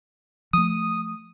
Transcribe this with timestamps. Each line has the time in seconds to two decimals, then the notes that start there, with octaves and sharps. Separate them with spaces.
0.53 F3 A3 D#6